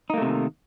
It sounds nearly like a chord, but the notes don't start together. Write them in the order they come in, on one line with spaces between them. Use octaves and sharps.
D#4 A#3 A3 C3 D#3